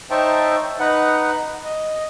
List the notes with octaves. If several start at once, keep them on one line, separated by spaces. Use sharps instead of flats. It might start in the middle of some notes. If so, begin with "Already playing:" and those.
D#4 C5 C#5 E5 G5 A5
D#4 B4 F#5
D#5